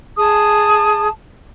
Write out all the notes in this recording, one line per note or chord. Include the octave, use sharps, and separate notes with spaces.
G#4 A5 D#6